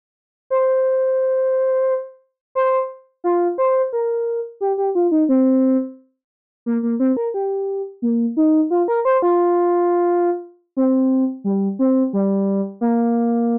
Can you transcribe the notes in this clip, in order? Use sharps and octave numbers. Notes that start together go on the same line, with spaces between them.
C5
C5
F4
C5
A#4
G4
G4
F4
D#4
C4
A#3
A#3
C4
A#4
G4
A#3
D#4
F4
A#4
C5
F4
C4
G3
C4
G3
A#3